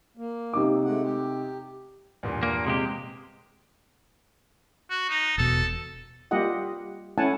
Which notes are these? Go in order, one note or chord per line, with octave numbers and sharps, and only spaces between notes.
A#3
C3 D#4 D6
G#3 A3 F#5
G4
E2 G2 A#2
A#3
C3 G#3 G4
F#4
D#4
E1 B2 A4
G3 A#3 F4 G4 D#5 F#5
A3 C#4 E4 F#5 G#5 A5